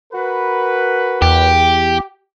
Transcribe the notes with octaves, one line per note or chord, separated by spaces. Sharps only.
F#4 A#4 B4
E2 G4